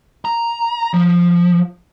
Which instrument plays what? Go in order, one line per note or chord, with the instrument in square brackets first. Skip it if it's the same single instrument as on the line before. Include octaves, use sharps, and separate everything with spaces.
[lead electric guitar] A#5
F3